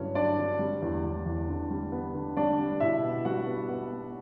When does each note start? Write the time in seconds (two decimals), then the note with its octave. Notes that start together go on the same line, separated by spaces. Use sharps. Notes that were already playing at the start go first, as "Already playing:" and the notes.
Already playing: G2 D3 F#3 C#4 E4
0.15 F#3 D4 D5
0.38 D3
0.59 G3
0.82 E2
1.04 E2
1.26 E2
1.49 D3
1.71 G3
1.92 B3
2.14 D3
2.37 G3 D4 D5
2.59 G3
2.80 B2 E4 E5
3.03 B3
3.25 G3 F#4 F#5
3.47 B3
3.69 B3
3.91 B3